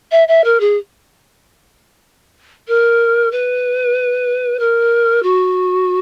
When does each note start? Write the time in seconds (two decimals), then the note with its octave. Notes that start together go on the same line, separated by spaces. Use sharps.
0.11 E5
0.28 E5
0.44 A#4
0.60 G#4
2.67 A#4
3.31 B4
4.59 A#4
5.22 F#4